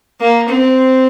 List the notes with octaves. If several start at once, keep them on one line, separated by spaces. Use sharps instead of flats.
A#3
C4